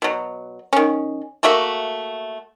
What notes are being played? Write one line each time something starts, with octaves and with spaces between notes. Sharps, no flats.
B2 F#3
D#3 C#4
A3 A#3 F#4 E5